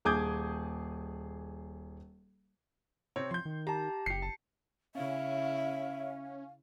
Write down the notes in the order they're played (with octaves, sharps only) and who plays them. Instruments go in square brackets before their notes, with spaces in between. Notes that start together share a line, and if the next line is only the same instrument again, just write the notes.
[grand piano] D#1 G#4 D6 D#6 G6 G#6
[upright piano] C3 C4 C#5
[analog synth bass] F3 [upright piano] C6 G6
[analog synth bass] D#3
[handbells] G4 A5 [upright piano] A#5
[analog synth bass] F#1 [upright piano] G4 C7 [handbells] C#7
[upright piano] A5
[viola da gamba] C#3 E4 [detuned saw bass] C#4 [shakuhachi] E5 [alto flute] F5